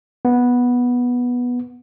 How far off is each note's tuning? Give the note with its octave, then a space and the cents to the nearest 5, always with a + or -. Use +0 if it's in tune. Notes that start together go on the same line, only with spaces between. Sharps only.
B3 -10